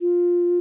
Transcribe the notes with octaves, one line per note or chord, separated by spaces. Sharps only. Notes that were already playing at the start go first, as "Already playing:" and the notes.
F4